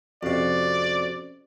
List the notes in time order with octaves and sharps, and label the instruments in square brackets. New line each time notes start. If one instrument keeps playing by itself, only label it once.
[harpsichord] F2 C3 [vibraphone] C#4 F#4 C5 [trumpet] D5